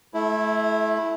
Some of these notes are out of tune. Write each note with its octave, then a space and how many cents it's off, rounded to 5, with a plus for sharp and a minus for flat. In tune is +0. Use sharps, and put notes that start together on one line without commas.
A3 -35 E4 +0